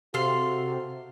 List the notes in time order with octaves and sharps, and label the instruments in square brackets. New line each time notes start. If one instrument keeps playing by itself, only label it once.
[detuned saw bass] C3 [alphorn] F#4 [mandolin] A4 F5 C6